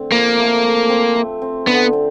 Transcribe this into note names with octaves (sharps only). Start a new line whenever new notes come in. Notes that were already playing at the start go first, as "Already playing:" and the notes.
Already playing: D3 A3 C4
F3 A#3
A3
A3
C4
A3
C4
D3 B3
C4